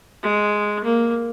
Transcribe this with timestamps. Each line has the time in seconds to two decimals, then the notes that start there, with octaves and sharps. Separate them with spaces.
0.23 G#3
0.84 A#3